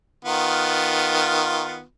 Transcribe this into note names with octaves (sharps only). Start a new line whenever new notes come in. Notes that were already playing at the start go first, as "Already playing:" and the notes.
D#3 B3 F4